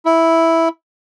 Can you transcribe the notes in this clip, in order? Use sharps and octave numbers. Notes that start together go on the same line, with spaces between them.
E4